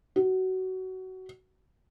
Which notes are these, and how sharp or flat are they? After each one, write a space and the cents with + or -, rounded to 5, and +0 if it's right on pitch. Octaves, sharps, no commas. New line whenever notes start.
F#4 +20